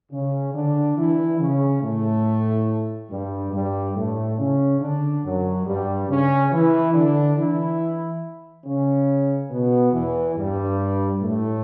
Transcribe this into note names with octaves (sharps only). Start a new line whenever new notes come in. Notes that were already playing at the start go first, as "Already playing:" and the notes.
C#3 C#4
D3 D4
E3 E4
C#3 C#4
A2 A3
G2 G3
G2 G3
A2 A3
C#3 C#4
D3 D4
F#2 F#3
G2 G3
C#3 C#4
E3 E4
D3 D4
E3 E4
C#3 C#4
B2 B3
E2 E3
G2 G3
A2 A3